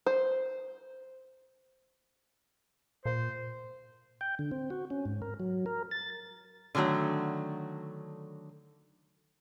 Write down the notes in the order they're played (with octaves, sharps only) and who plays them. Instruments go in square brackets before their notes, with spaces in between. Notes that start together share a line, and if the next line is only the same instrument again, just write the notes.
[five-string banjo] C5
[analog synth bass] A#2 [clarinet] C5
[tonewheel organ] G5
D3
C4
F#4
C#4
G#2
A#4
F#3
A#4
A6
[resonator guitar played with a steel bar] D3 D#3 F#3 A3 F#4